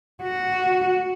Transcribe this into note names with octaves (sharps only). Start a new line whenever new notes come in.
F#4